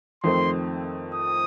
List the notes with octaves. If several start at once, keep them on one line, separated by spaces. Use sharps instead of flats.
F2 D#3 A3 C4 C6
D#6